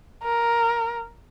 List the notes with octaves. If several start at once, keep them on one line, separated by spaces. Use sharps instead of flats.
A#4